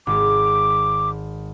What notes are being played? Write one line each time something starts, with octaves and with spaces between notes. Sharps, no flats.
G#1 D6